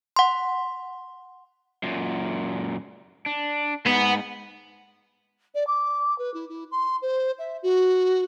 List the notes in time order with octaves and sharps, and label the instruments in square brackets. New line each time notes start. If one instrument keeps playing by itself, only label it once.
[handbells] F#5 C6
[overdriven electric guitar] F#2 A#2
D4
[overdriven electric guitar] G#2 [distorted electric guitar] B3
[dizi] D5
D6
B4
E4
E4
C6
C5
E5
F#4